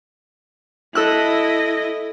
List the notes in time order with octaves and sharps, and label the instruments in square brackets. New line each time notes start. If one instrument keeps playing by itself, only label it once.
[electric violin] E4 D#5 [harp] A4 E6 F#6